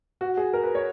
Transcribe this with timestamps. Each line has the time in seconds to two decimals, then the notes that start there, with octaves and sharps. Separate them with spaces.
0.21 F#4
0.37 G#4
0.54 A#4
0.64 B4
0.75 C#5